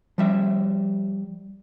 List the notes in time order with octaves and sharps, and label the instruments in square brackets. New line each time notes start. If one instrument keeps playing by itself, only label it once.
[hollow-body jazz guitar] F3 G3 E5